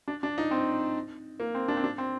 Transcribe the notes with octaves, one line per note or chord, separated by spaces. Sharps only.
D4
D4
D#4
C4
A#3
C4
D4
C4
D4
C4